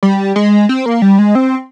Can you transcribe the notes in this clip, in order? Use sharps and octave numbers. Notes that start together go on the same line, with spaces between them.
G3
G#3
C4
A#3
G3
G#3
C4